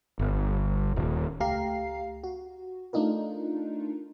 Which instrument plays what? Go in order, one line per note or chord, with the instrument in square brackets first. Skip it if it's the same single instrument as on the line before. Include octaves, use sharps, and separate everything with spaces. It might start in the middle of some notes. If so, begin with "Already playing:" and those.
[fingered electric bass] G1
D#1
[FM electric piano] C#2 A3 G4 F5 A#5 C7
F#4
A3 D4 D#4 F4 A#4